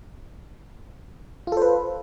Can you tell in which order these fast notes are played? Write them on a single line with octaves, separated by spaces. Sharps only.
F4 A4 C5 B4